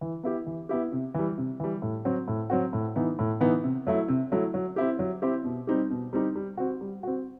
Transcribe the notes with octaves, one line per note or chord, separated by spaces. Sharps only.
E3
B3 E4 G4
E3
B3 E4 G4
C3
E3 G3
C3
E3 G3
A2
F#3 C4 F#4
A2
F#3 C4 F#4
A2
E3 B3 D#4
A2
E3 B3 D#4
C3
F#3 A3 E4
C3
F#3 A3 E4
F#3
C4 E4 G4
F#3
C4 E4 G4
B2
G3 C4 D#4 G4
B2
G3 C4 D#4 G4
G3
C4 F#4
G3
C4 F#4